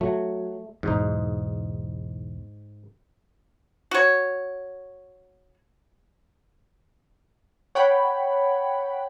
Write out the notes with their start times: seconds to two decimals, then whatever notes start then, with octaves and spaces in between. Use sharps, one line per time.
0.01 F#3 A3
0.83 B1 E2 G#2 D#4
3.91 F#4 C#5
7.75 C#5 F#5 G5 B5